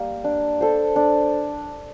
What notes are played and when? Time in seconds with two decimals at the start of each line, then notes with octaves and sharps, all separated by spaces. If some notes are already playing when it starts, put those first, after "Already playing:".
Already playing: G3 A#3
0.24 D4
0.61 A4 C5
0.96 D4